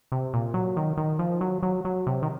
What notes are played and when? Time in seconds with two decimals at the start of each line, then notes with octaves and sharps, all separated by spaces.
0.12 C3
0.33 A#2
0.54 F#3
0.77 D#3
0.97 D#3
1.19 F3
1.41 F#3
1.63 F#3
1.85 F#3
2.07 C3
2.23 D#3